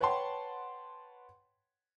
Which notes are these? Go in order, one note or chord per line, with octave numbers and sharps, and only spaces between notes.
B4 C#5 F#5 G5 A5 C6